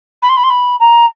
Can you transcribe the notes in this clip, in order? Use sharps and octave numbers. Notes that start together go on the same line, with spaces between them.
B5
C6
B5
C6
B5
A#5